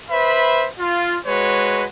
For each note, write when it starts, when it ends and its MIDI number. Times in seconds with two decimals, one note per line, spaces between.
0.11 0.67 71
0.11 0.67 72
0.11 0.67 76
0.11 0.67 83
0.80 1.17 65
1.27 1.86 56
1.27 1.86 66
1.27 1.86 71
1.27 1.86 73